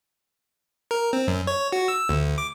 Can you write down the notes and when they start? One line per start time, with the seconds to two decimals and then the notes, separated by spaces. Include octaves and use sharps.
0.91 A#4
1.13 C4
1.28 F#2
1.47 C#5
1.72 F#4
1.88 E6
2.09 D2
2.38 D6